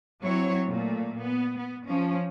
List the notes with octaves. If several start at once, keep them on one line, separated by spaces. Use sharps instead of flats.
F#3 C4 E4 C#5
A#2 A3
B3
B3
F3 C#4